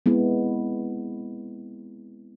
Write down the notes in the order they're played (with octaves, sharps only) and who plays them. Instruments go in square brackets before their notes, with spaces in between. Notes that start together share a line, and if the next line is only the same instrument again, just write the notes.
[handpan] G#3 B3 C4 E4